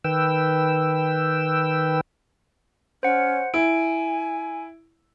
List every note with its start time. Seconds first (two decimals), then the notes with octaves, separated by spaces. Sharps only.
0.04 D#3 B4 G5 E6
3.03 C#4 C5 F#5
3.54 E4 G#5 D7